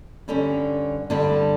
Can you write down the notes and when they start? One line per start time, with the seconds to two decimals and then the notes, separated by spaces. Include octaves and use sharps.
0.28 G2 D3 G3 C#4
1.10 G2 D3 G3 B3 D4